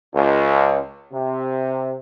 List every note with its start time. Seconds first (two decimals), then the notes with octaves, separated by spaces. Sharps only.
0.13 C#2
1.12 C3